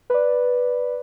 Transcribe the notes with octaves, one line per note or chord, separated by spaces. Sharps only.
B4 D5